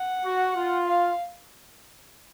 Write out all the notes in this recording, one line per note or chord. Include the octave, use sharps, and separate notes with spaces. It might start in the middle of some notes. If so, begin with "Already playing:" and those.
Already playing: F#5
F#4
F4
F5